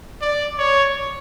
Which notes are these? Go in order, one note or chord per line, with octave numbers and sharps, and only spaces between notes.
D5
C#5